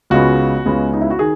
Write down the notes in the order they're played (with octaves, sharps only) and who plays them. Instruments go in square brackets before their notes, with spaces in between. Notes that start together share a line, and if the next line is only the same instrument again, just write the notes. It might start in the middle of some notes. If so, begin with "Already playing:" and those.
[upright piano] C#2 C#3 G#3 B3 F#4
C#2 C#3 G#3 B3
D#4
E4
F#4
D#3 G#4